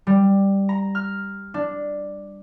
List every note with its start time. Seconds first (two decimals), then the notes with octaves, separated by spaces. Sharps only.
0.07 G3
0.69 A#5
0.95 F6
1.54 D4